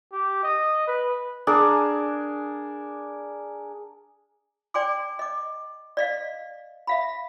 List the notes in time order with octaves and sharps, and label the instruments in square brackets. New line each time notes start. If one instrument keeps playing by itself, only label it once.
[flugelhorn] G4
D#5
B4
[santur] D4 G#4 A#4
[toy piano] D5 G5 G#5 C6 D6
D#5 D6
D5 D#5 F5
E5 F5 B5